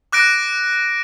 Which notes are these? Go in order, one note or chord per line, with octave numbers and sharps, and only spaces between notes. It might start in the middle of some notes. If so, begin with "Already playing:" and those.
D6 F#6 A#6 D7